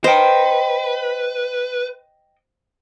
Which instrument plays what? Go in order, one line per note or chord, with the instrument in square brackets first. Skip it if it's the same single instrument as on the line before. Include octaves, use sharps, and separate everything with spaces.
[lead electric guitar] B4 [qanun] C5 [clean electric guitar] D#5 G5